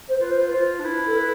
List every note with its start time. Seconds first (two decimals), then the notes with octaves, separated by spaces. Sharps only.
0.09 C5
0.20 F4 B4
0.31 C5
0.52 F4 C5
0.79 D4
0.84 E4 B4
1.07 A4
1.16 B4